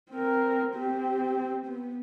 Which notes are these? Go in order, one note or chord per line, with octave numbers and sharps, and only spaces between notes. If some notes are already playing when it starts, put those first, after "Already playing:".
C4 A#4
C4 G4
B3